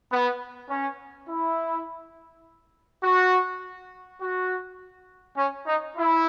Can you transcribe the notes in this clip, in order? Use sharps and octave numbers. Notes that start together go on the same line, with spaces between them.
B3
C#4
E4
F#4
F#4
C#4
D#4
E4